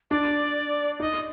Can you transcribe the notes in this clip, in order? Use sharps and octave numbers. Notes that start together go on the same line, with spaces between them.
D4 D5
D#4 D#5